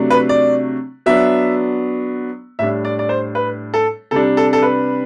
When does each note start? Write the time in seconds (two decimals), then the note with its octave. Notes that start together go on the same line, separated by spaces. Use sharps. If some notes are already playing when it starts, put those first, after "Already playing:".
Already playing: C3 F#3 A3 D4
0.10 B4
0.29 D5
1.06 F#3 B3 D4 E5
2.59 A2 G3 D4 E5
2.85 D5
2.99 D5
3.09 C5
3.35 B4
3.74 A4
4.11 C3 G3 D4 A4
4.37 A4
4.53 A4
4.62 B4